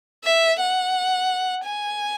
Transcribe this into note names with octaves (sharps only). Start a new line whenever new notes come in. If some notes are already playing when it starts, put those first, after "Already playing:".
E5
F#5
G#5